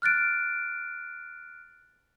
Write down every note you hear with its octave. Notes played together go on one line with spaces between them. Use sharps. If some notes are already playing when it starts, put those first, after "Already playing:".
F6 F#6 A6 D7